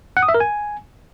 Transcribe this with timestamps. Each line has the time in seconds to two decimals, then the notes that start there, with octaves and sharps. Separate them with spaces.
0.17 F#5
0.23 D#6
0.28 E5
0.34 A#4
0.40 G#5